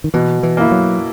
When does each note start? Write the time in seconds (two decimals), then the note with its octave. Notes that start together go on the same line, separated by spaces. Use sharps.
0.04 D#3
0.14 B2 E3
0.43 E3
0.57 A#3 E4
0.71 F#3